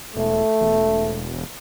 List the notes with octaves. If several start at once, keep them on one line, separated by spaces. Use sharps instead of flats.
E1 A3
E1